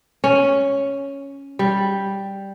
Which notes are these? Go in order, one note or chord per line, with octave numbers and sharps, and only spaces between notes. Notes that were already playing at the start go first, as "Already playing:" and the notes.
C#4
G3